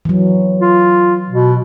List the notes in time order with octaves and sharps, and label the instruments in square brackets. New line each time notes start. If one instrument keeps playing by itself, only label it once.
[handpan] E3 F#3
[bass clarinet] F4
B2